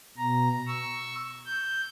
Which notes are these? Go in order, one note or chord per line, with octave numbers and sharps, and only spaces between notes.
B2 A#5
C#6 E6
G6